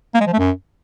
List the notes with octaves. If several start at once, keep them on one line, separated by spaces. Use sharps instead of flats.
A#3
G#3
F3
A3
F#2